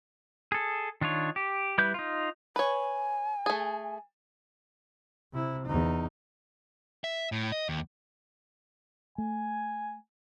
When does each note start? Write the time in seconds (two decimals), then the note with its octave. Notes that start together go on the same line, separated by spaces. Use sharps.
0.52 G#4 A4
1.01 D#3 D4 F4 C#5
1.36 G4
1.78 G3 E4 B4 G6
1.94 D#4 F4
2.56 B4 C#5 G#5
3.46 A3 G#4
5.33 C3 E4
5.66 E2 D#4
7.04 E5
7.32 A2
7.52 D#5
7.69 D#2
9.18 A3 G#5